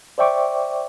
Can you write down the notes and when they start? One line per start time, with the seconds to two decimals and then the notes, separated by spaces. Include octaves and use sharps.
0.18 C5 D5 E5 G5 C#6 D6